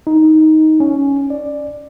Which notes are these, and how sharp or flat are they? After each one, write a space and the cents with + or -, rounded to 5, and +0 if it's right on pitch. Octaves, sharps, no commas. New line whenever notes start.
D#4 +10
C#4 +5
D5 +10